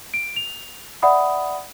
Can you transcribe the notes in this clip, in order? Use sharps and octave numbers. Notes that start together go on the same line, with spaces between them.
D7
F7
D5 E5 F#5 B5 D#6